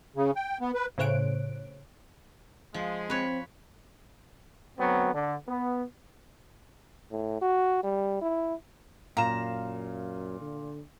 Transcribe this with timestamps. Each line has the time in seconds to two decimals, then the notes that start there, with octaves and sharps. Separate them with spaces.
0.16 C#3
0.36 G5
0.61 B3
0.74 B4
0.98 A2 C#3 C5 C#5 F#6 D7
2.74 F3 G#3
3.10 C4 B4 C#5
4.79 D2 F#3 B3 C4
5.14 D3
5.48 B3
7.11 A2
7.42 F#4
7.84 G3
8.22 E4
9.17 F#2 A#2 F5 A#5 E7
10.41 D3